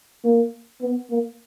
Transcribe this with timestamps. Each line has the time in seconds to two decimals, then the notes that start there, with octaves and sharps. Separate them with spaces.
0.24 A#3
0.81 B3
1.10 A#3